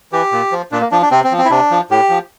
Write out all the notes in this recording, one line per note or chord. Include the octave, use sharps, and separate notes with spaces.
E3 G4
A#2
F3
A#2 D4
A#3
F3 D4
D4
C3 C4
C4
F3
C4
E4
C3 D4
F3
A2 G4
F3